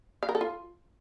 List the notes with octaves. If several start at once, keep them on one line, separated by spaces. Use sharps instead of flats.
F5
A#4
A4
F4